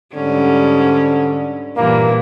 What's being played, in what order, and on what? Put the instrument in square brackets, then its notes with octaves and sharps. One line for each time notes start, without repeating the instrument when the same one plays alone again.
[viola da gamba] G#2 G3 C#4 [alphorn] D3
[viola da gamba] G2 A#2 E3 [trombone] A#3